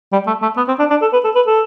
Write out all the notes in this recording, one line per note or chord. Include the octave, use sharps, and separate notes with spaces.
G3
A3
A3
B3
C4
D4
D4
A4
B4
A4
B4
A4